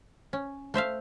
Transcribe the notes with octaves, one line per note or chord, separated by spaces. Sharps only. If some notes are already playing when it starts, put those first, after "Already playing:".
C#4
A3 C5 E5 F5